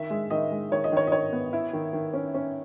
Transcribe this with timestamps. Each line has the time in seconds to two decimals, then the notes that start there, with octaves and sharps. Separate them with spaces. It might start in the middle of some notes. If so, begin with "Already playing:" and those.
Already playing: D#3 E5
0.10 G#3
0.30 D#3 D#5
0.51 G#3
0.71 D#3 C#5
0.84 D#5
0.92 D#3 C#5
1.07 D#5
1.12 D#3 C#5
1.33 B3
1.53 E4
1.73 D#3
1.93 D#3
2.13 C#4
2.34 C#4